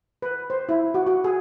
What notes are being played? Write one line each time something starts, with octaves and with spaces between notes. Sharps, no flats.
B4
C5
E4
F#4
F#4
G#4